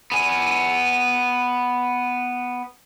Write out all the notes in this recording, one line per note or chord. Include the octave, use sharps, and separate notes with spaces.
B3 G#5